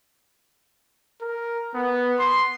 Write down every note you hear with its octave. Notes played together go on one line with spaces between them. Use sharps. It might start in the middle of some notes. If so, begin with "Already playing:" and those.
A#4
B3
C6